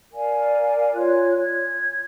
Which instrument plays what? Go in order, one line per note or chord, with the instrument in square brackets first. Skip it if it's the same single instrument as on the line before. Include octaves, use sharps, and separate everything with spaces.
[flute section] A#4 D5 F5 G#5
F4 C#5 F#6
G#6